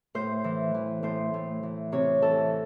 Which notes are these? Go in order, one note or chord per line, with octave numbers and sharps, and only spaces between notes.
A2 C5
E3
E3
A2 C5
A2
E3
C3 C#5
E3 A4